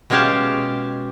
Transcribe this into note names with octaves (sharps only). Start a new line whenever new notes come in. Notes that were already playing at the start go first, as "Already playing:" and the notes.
B2 G#3 C#4 G4 F5 A5